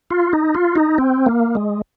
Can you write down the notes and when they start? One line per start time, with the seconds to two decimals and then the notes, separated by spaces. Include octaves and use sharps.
0.11 F4
0.33 D#4
0.55 F4
0.75 D#4
0.98 C4
1.26 A#3
1.55 G#3